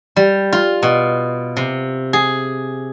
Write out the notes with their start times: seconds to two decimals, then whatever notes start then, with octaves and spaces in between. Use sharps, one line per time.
0.16 G3
0.53 F4
0.83 B2
1.57 C3
2.13 G#4